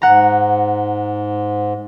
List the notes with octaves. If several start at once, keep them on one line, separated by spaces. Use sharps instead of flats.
G#2 F#5 A#5